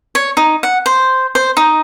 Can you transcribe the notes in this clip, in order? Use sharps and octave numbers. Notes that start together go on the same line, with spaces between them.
C#5
D#4
F#5
C5
C5
D#4